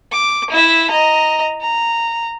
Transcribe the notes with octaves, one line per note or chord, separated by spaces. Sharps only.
D6
E4 E5
D#5 A#5
A#5